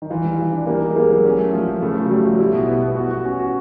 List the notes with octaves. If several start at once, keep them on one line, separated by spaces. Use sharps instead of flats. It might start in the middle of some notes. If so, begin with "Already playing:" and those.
D#3
E3 F4
G3
F4
D4
G3 A#3
D#4
G#3
G3 A#3
F#3
C#4
A3
F3
F3
C#3 A3
F3
F#3
G3 A3
F3 F#3
G3 E4
B2
B3
B3
F#4
F#4
C#4
F#4